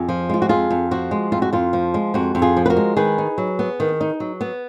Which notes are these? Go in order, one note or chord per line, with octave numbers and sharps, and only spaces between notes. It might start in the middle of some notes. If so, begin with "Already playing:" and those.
Already playing: F2 F4 G#4
F3
G#3 F4
F#4
F2 F4 G#4
F2
F3 F#4
G#3
F2 F4
F#4
F2 F4
F3
G#3
F2 F#4
F2
F4 G#4
F3
B4
F#4 A#4
G#3
D#3 G#4 B4
D#4
F#3
B3
D#3
D#4
F#3
B3